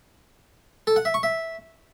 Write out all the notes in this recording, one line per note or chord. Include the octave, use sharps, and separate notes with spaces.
A4
F#5
E5
C#6
E5